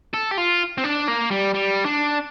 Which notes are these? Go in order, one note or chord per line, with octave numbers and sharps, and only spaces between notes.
A4
G4
F4
C4
D4
A#3
G3
G3
D4